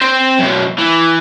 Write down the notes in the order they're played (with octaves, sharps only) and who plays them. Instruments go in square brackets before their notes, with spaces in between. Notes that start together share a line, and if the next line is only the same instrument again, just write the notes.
[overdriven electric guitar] C4 C5
F#2 B2
E3